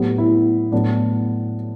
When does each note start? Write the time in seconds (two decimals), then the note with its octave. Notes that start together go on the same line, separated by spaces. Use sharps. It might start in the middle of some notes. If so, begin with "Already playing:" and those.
Already playing: A2 F#3 B3 G4
0.18 E4
0.72 A2 F#3 B3 D4